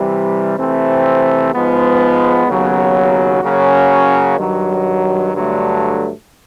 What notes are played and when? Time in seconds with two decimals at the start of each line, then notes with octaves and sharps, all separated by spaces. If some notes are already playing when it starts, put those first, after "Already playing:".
Already playing: C3 E3 G3
0.58 C3 E3 A3 C4
1.53 G#2 F3 G#3 B3
2.48 D#2 C#3 F#3 B3
3.43 C#3 F#3 A#3 C#4 F#4
4.38 G2 D#3 F#3
5.34 G2 D3 F#3 A3